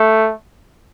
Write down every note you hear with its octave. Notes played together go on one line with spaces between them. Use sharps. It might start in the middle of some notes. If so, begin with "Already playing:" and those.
Already playing: A3